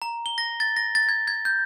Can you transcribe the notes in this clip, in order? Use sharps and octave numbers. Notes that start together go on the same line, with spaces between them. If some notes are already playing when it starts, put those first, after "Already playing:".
A#5
G7
A#6
A6
A#6
A6
G#6
G#6
G6